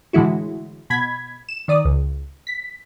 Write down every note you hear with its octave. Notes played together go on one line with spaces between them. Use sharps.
A2 D3 E3 G#3 E4 F#4
B2 B5 G#6 B6
E7
D#3 D5 D#6
C#2
B6